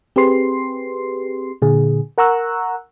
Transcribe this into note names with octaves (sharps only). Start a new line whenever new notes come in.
C4 G4 G#4 B4 C6 C7
A#2 D3 G#4
A#4 F#5 A#5 C#6 E6 F#6